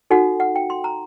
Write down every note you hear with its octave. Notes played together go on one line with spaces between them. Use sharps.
D#4 F#4 A4 F#5
F#5
G5
C6
A#5